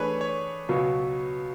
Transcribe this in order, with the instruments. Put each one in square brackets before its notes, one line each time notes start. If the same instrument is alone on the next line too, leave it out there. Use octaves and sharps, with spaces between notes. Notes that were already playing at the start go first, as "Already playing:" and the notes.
Already playing: [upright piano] E3 A3 D4 G#4 [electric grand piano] B4 C#5
[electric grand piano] C#5
[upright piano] C#2 B2 F#3 B3